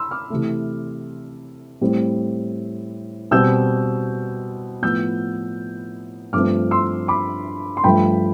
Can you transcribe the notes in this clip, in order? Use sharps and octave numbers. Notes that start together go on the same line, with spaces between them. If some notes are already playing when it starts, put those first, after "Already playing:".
Already playing: B5 C6 E6
D6 F6
C3 E3 A3
A2 G3 C4
B2 G3 C4 E6 G6
A2 F3 B3 E6 G6
G2 F3 A3 C4 D6 F6
C6 E6
B5 D6
C6
G2 F3 A3 G5 B5